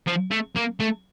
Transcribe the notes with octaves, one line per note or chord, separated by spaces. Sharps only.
F3
A3
A#3
A3